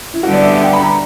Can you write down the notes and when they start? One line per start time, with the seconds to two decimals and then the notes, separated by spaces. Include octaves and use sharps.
0.14 E4
0.23 D3 G3 B3 F#4
0.34 D5
0.43 E5
0.53 F#5
0.64 G5
0.73 B5
0.83 A#5